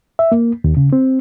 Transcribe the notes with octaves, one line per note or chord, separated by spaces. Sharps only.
E5
A#3
D#2
C#3
C4